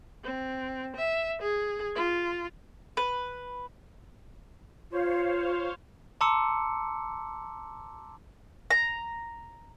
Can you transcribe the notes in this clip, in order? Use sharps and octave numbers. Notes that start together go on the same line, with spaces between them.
C4
E5
G#4
F4
B4
F4 C5 C#5 F5
A5 A#5 C6 D6 E6 C#7
A#5